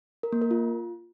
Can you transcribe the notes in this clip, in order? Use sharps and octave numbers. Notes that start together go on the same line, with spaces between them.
A#4
A#3
A#4
F4